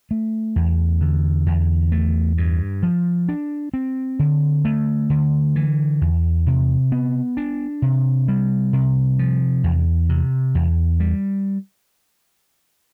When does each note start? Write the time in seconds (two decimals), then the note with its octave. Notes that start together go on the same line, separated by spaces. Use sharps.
0.11 A3
0.56 E2
1.01 D3
1.46 E2
1.92 A3
2.38 G2
2.83 F3
3.29 D4
3.74 C4
4.19 D3
4.65 A3
5.10 D3
5.56 E3
6.01 E2
6.46 C3
6.92 B3
7.37 D4
7.82 C3
8.28 G3
8.73 C3
9.19 F3
9.64 E2
10.09 C3
10.55 E2
11.00 G3